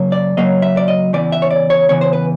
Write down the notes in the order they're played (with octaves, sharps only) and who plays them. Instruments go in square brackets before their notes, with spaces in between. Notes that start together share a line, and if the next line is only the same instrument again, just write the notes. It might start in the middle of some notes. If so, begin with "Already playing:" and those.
Already playing: [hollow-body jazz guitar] F#2 C#3 F#3 A#3
D5
F#2 C#3 F#3 A#3 D#5
E5
D5
D#5
E2 C#3 E3 D5
E5
C#5
D5
C#5
E2 C#3 E3 C#5
C5
B4